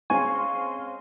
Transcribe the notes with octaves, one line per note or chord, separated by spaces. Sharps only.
G#3 C4 C#4 F5 G#5 C6 C#6